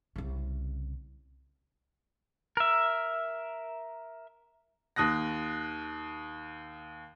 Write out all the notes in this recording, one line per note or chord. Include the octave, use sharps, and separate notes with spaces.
C2 C#3
A#4 E5
D#2 D#6 F#6 A#6